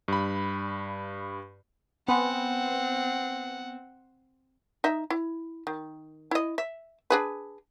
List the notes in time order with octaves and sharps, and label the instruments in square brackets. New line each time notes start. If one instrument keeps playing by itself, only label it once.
[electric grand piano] G2 B5
[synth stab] B3 [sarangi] C4 [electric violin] F#5 [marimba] G#5 B5 C6
[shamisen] D#4 D#5 E5
E4
D#3
E4 D#5
E5
D4 G#4 B4